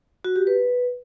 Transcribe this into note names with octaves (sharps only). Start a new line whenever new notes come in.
F#4
G4
B4